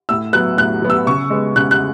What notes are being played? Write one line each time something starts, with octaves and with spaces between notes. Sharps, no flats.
A2 E6
F#3 B3 F#6
A2 F#6
F#3 B3
E6
C#3 C#6
G#3 B3
C#3 F#6
F#6